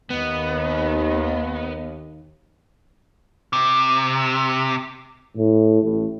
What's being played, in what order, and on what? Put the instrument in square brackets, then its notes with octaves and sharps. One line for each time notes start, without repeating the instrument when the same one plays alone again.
[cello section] D#2 [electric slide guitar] B3 [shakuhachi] D#5
[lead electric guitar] C3
[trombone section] A2
A1 A2